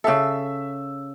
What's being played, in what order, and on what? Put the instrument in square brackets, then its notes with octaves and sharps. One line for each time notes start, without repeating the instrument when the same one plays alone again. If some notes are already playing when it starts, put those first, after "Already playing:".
[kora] C#3 A4 [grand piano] E5 E6